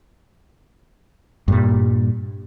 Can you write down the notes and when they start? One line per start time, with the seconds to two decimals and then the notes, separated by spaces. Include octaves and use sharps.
1.48 G2 A#2 G3